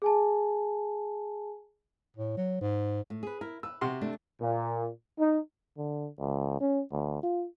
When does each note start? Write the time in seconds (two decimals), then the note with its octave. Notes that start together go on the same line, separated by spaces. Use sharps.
0.02 G#4 G#5 A5
2.17 A2
2.37 F#3
2.61 G#2
3.10 A2
3.23 G#4 B4
3.41 E4 A#4
3.63 B4 E6
3.81 C3 F#4 C6
4.01 A3 D4
4.41 A#2
5.19 D#4
5.77 D3
6.19 C#2
6.61 C#4
6.92 D2
7.23 F4